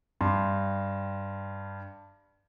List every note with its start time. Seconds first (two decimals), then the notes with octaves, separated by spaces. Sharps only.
0.21 G2 C6